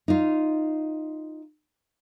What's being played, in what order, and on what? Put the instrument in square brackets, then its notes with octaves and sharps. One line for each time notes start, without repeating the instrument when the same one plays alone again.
[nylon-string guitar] D#4 F4